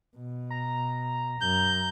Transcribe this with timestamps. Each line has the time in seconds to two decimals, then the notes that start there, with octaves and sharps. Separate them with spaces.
0.16 B2
0.51 A#5
1.41 F#2 G6